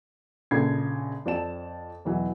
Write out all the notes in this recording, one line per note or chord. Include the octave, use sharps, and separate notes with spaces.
A#1 C#3 A4 B5 G#6 C7
F2 C4 D5 A5 E7
E2 B2 E3 F#3